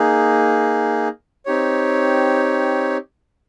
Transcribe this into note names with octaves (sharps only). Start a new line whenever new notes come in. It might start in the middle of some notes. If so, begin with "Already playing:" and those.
Already playing: A#3 D#4 G#4
C4 D#4 G4 C#5